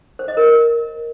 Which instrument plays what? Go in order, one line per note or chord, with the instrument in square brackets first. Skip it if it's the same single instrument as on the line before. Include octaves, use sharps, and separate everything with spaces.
[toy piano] C5
D#5
A#4